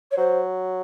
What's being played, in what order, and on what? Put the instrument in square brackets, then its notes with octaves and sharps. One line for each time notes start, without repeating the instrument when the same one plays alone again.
[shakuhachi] C#5
[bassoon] F#3 [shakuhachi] C5